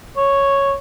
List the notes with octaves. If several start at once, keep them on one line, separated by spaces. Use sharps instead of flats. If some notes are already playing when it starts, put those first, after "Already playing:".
C#5